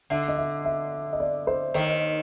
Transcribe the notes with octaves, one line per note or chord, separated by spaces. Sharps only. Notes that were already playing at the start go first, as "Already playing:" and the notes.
D3 E5
D#5
E5
E5
D#5
D5
C5
D#2 D#3 C5